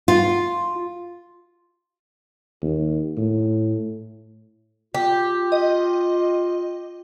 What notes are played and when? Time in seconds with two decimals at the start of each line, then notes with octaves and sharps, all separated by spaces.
0.08 F4
2.62 D#2
3.17 A2
4.94 F4 G4
5.52 D#5